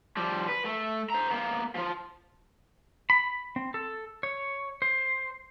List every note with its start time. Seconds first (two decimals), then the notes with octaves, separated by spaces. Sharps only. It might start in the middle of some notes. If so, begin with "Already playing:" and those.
0.17 F3 G3
0.48 B4
0.65 A3
1.10 C5 A#5
1.30 A#3 B3
1.75 F3 F4
3.10 B5
3.56 C4
3.74 A4
4.23 C#5
4.82 C5